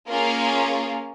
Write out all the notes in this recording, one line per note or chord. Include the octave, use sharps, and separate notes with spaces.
A#3 C#4 F4 G#4 A#4